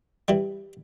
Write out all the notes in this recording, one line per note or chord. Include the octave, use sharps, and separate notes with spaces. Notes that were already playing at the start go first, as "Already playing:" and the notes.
E3 G3